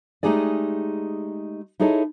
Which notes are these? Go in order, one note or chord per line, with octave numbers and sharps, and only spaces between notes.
G#3 A3 D#4 G4 G#4 D5
D#4 E4 G#4 A4 C#5 D#5